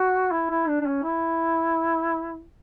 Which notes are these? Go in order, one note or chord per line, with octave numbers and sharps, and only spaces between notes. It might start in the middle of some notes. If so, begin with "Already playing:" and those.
Already playing: F#4
E4
E4
D4
D4
C#4
E4